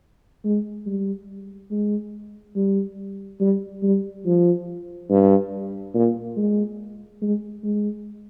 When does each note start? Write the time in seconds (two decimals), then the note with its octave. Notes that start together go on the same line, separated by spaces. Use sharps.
0.45 G#3
0.86 G3
1.71 G#3
2.56 G3
3.40 G3
3.83 G3
4.25 F3
5.10 G2
5.94 A#2
6.37 G#3
7.22 G#3
7.64 G#3